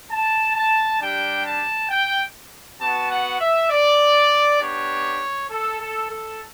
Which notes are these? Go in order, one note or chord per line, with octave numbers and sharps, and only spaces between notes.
A5
A5
G3 D4 G4 G5
A5
G5
B3 F#4 A5
F#5
E5
D5
B3 D4 G4 C#5
A4
A4
A4